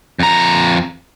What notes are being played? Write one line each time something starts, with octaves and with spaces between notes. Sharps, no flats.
F2 A#5